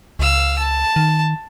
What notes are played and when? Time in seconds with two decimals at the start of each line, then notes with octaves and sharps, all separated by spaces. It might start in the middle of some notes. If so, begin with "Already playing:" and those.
0.19 C#2 F5 E6
0.59 A5
0.96 D#3